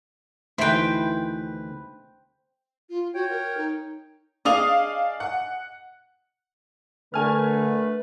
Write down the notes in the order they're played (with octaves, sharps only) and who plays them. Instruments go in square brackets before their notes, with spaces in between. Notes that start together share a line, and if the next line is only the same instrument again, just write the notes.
[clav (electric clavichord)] D2 D#3 E3 [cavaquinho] E4 B4 [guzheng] C5 G5
[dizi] F4
[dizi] F#4 [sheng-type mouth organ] C#5 G5
[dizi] A#4
D#4
[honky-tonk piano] D4 F5 F7 [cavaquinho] G#4 D#5 D6
[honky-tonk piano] F#5
[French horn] D3 [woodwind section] A3 [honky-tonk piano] A#4 G#5 F6 [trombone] B4